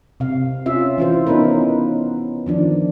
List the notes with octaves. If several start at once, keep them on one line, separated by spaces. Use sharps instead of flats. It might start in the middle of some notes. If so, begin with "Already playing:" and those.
C3 F5
C#4 F4 E5
E3 F4 C5
B3 C#4 D#4 A#4 B4
D#3 F3 D4